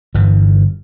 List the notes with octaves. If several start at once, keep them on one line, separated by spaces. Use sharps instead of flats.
G1 G2 E3